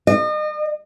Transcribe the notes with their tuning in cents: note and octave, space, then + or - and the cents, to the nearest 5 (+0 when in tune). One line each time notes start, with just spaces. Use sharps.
D#5 -35